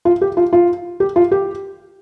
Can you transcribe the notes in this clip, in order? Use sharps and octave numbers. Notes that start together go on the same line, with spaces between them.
F4
G4
F4
F4
G4
F4
G4